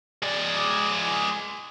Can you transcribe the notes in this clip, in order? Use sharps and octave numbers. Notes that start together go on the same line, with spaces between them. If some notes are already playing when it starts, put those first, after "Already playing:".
G#3 D5